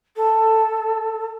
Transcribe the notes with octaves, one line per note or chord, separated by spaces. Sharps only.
A4